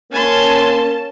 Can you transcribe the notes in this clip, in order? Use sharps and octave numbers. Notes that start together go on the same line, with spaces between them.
A#3 C#4 G#5 A5 C6